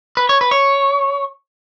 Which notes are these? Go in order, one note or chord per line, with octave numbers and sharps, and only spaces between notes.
B4
C#5
B4
C#5